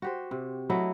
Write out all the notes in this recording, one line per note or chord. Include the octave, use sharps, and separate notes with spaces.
F#4 G4 C5
C3
F#3 A3 E4 D#5